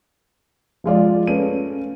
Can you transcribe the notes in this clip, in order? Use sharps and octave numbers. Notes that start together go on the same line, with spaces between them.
F3 G#3 F4 D5
A3 C#4 B4 D#7